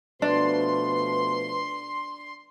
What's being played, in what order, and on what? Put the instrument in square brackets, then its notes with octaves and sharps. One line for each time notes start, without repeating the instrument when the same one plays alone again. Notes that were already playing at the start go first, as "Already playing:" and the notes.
[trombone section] B2 F3 A3 [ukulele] D4 [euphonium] B4 [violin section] C6